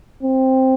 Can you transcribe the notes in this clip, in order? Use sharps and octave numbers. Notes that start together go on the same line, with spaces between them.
C4